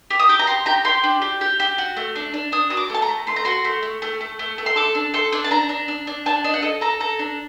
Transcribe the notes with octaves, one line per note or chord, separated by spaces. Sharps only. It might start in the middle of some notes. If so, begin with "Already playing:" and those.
G4
D#6
G4 D6
A#5
G4 C6
G4 A#5
G4 C6
D4
G4
G4
G4
F#4
A3
D4
D4
D4 D#6
F#4 D#6
D6
A3 A5
A#5
A3
A3 C6
A#5
F#4 C6
A3
A3
A3
A3
A3
A3
C6
A4 D6
D4
A4 C6
D4
A5
D4 A#5
D4
D4
D4
D4 A5
D4 D#5
F#5
A4 D#5
A4 A#5
A4 A#5
D4